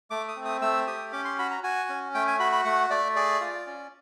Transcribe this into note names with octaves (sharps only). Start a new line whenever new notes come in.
A3 D6
D#6
C4
D#6
A3 E6
G4 D#6
C#4 D6
C6
F#4 B5
A#5
F#4 G#5
C#4
A3 G5
G#5
F#4 B5
B5
A3 F#5
A3 D5
G#4 D5
F4
C#4